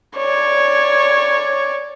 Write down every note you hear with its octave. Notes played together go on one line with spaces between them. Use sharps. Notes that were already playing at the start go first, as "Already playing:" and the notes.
C#5 D5